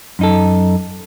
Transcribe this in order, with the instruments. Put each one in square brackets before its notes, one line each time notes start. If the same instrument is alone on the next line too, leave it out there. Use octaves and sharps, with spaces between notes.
[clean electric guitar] F#2 D#4 A4